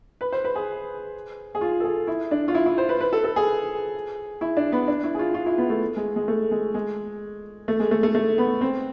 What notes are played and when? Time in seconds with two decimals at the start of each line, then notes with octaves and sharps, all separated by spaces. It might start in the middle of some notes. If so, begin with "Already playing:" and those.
0.21 B4
0.32 C5
0.44 B4
0.55 G#4
1.55 G#4
1.61 F4
1.80 A4
1.84 G#4
2.07 E4
2.31 D4
2.48 F4
2.55 E4
2.66 E4
2.78 C5
2.89 B4
3.01 B4
3.13 A4
3.24 A4
3.36 G#4
4.41 E4
4.57 D4
4.72 B3
4.88 D4
5.04 E4
5.15 G#4
5.19 F4
5.34 F4
5.46 E4
5.58 B3
5.70 A3
5.97 G#3
6.16 G#3
6.28 A3
6.51 G#3
6.74 G#3
7.68 A3
7.80 G#3
7.91 A3
8.03 A3
8.15 A3
8.38 B3
8.61 C4